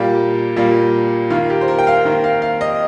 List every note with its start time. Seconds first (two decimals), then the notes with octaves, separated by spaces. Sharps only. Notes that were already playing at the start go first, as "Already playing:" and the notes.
Already playing: A#2 G3 A#3 G4
0.56 A#2 G3 A#3
1.30 D#3 A#3 F4
1.50 G4
1.61 C5
1.68 A#4
1.79 G5
1.87 F5
2.05 D#3 A#3
2.24 F5
2.42 F5
2.61 D#5